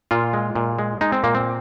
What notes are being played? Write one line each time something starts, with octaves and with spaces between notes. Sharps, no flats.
A#2 F4
G#3
A#2
G#3
G#3 D#4
C4
A#2 A#3
C4